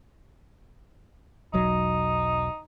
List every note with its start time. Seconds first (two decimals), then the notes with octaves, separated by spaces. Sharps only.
1.53 E1 B1 F#3 D#4